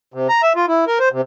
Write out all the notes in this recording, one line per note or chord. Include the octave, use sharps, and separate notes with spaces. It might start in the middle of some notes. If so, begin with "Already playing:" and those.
C3
A#5
E5
F4
E4
A#4
C5
C3